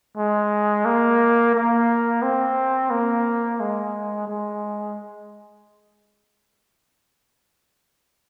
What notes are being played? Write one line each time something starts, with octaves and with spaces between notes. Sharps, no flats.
G#3
A#3
A#3
C4
A#3
G#3
G#3